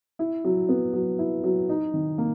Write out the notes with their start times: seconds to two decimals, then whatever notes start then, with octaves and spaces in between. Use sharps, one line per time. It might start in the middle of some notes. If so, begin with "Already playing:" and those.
0.19 E4
0.45 F#3
0.69 B3
0.93 F#3
1.19 E4
1.44 F#3
1.69 D#4
1.94 D#3
2.18 A#3